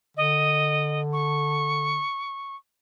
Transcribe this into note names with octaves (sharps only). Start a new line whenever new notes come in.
D3 D#5
C#6